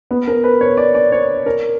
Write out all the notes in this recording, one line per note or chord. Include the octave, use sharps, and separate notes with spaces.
B3
A#4
B4
C#5
D5
D5
C#5
A#4